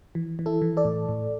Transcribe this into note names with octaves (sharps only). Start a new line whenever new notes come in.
E3
E3
E4 A4
E3
A4 D5
A2
A2